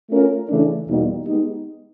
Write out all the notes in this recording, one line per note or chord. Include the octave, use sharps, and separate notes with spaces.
A3 C#4 F4 A#4
C#3 E3 A3 D4
E2 B2 G3 A#3 D#4
G#3 B3 D#4 G4